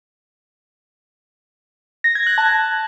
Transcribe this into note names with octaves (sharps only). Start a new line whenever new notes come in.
A#6
G#6
F#6
A5